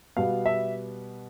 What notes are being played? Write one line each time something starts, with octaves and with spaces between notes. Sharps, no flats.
B2 G3 B3 F5
E5